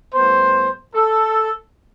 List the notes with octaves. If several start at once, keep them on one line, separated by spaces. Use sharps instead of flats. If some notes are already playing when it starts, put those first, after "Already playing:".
A2 G3 B3 C5
A4